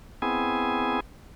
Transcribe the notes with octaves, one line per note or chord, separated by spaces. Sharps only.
B3 C4 E4 G#4 G#5